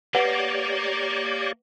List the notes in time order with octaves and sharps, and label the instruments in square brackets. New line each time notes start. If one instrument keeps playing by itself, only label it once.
[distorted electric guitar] A#3 [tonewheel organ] G4 C#5 D5 [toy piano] B4 F#5